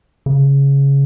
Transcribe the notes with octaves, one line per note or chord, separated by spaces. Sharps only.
C#3